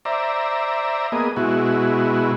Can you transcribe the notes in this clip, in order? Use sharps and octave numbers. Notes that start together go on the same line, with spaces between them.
C5 D5 E5 A#5
A#3 B3 G#4 D#5
B2 G#3 E4 F#4